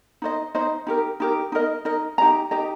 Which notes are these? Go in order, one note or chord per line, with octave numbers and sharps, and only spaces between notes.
D#4 C5 D#5
D#4 C5 D#5
D#4 G4 A#4
D#4 G4 A#4
D#4 A#4 D#5
D#4 A#4 D#5
D#4 G4 D#5 A#5
D#4 G4 D#5 A#5